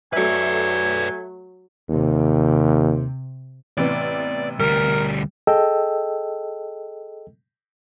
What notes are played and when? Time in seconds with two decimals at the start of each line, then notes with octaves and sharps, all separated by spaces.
0.13 F#3 A3 B4 D5 E5 G#5
1.89 D#2 C3
3.78 A1 C3 B3 D5
4.60 D2 G3 A#4
5.47 G#4 A4 D#5 G5 A5 E6